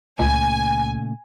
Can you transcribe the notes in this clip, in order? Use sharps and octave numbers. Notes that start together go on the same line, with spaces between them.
C#2 A#2 C#3 A3 G#5